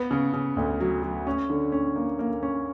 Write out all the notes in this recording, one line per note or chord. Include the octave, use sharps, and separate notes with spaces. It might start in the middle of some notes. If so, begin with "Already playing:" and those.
Already playing: B3
C#3
C#3
D2
F#3
F#3
C#4
D3
C#4
A#3
A#3
C#4